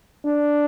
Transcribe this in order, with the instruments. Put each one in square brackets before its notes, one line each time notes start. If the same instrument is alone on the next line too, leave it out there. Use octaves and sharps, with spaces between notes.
[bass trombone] D4